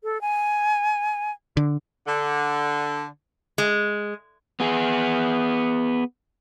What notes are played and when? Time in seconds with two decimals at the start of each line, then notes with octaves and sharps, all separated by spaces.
0.04 A4
0.21 G#5
1.57 D3
2.06 D3
3.58 G#3
4.60 B3 G#4